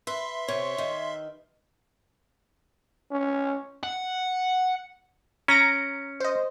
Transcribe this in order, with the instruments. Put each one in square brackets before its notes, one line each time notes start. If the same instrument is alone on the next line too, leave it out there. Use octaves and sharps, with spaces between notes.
[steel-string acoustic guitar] B4 [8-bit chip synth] E5 C6
[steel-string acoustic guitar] C3 [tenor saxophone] C#5
[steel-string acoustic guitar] D#3
[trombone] C#4
[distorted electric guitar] F#5
[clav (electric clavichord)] C#4 [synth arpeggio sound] A#5 A#6 D7
[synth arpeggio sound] C5 D#5